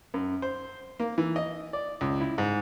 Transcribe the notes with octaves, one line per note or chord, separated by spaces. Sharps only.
F#2
C5
A#3
E3
D#5
D5
C#2
E4
G#2